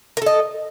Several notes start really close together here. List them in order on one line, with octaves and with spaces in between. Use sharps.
A#4 A4 D#5